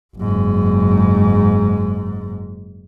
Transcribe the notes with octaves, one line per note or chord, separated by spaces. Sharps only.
F#1 G#2